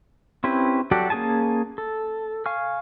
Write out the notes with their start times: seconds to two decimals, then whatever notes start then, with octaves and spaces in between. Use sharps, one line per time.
0.44 C4 C#4 E4 G4 B4
0.91 F#3 F#4 G4 A4 D5
1.10 A#3 C#4 G#4 G#5 A5
1.78 A4
2.46 F5 G#5 C#6 F6